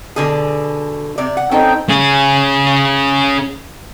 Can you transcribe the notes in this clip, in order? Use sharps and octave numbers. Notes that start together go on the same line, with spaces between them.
B2 D3 G#4
C3 D5
F#5
C4 C#4 D#4 A4 G5
C#4 G#4